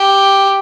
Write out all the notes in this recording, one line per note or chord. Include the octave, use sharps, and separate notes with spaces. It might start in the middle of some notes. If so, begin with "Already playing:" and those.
Already playing: G4